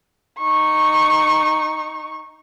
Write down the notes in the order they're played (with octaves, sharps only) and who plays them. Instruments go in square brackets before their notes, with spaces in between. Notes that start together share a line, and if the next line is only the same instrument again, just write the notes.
[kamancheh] D#4 C#6